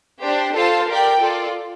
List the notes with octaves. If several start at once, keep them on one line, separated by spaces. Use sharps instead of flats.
D4 G4 C5
F4 A4 C5 F5 A5
G4 A#4 D5 G5
F4 A4 D5